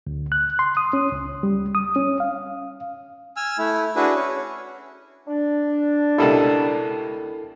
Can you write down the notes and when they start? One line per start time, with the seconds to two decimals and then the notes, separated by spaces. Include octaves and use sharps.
0.07 D2
0.32 F#6
0.59 C6
0.77 D#6
0.93 C#4
1.12 C#2
1.43 G3
1.75 D#6
1.96 C#4
2.20 F5
3.37 G#5 E6 F6
3.59 A3 E4
3.96 D4 E4 F#4 G#4 B4
4.16 C#4 C#5
5.26 D4
6.18 C#2 B2 G3 E4 A4 A#4